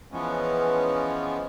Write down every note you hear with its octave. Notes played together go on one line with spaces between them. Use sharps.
E3 F3 G#3 B3 C#4